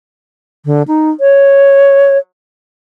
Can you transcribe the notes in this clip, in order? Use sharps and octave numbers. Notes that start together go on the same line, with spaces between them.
D3
D#4
C#5